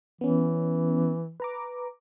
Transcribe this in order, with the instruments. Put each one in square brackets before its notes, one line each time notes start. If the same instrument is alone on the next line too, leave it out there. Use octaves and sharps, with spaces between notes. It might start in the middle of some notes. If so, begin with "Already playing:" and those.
[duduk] E3 [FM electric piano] B3 C#4
[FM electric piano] B4 A#5 D6